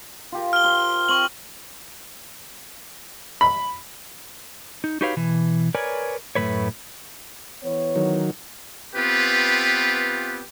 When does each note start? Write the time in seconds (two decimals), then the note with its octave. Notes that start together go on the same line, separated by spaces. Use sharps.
0.32 F4 G4 A#4
0.53 F6 G7
0.64 C5
1.09 C4 C#6 F#7
3.41 B5
4.84 D#4
5.01 D#4 F#4 G4 B4 C#5 F5
5.16 B2 E3
5.75 A#4 B4 C#5 D5 G#5
6.35 F#2 A2 C3 A3 B4 C#5
7.63 E3 B3 C#5
7.96 D#3 F#3
8.96 B3 C4 F4 G4 B4